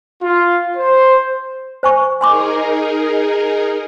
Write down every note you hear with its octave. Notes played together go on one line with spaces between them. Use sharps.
F4
C5
C5 G#5 C#6
D#4 G#4 A#4 G#5 C6 D6